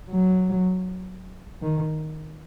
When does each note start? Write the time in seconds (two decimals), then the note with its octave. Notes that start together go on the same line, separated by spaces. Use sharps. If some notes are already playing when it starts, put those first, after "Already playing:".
0.10 F#3
1.62 D#3